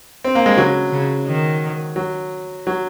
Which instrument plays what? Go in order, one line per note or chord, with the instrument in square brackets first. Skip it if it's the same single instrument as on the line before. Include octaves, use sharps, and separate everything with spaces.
[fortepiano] C4
A#3
G#3
[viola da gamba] C#3 [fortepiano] F#3
[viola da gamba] C#3
D#3
[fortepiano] F#3
F#3